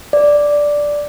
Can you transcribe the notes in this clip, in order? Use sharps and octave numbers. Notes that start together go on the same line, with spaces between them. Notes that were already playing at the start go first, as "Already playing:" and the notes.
D5